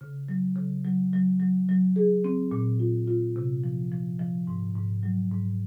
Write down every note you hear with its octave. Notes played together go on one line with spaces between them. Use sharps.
C#3
F#3
C#3
F#3
F#3
F#3
F#3
G#4
C4
A#2
F4
F4
C3
F3
F3
F3
G#2
G#2
F#3
G#2